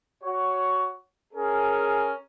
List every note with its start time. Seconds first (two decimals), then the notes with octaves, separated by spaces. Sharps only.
0.23 F#4 C#5
1.34 C#4 G#4 A#4